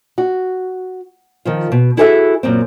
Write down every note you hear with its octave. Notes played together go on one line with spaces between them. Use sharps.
F#4
D#3 F3 F4
B2
E4 F#4 G#4 A4 C#5 E5
F#2 A#2 C4